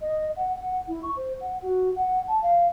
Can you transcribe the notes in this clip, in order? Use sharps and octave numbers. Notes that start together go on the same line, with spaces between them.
D#5
F#5
F#5
E4
C#6
C5
F#5
F#4
F#5
A5
F5